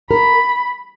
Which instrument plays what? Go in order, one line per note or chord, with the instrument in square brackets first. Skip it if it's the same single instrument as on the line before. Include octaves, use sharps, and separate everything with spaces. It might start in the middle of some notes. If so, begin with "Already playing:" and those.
[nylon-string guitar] A#4 [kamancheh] B5